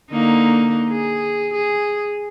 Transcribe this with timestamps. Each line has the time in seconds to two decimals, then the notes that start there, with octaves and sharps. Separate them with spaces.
0.11 D3 A#3 D#4
0.90 G#4
1.54 G#4